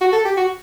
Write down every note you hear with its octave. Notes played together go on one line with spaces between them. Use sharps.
F#4
A4
G4
F#4